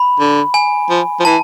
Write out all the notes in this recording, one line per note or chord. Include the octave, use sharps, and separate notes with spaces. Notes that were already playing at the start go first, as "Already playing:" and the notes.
Already playing: B5
D3
G#5
F3
F3
E3 A5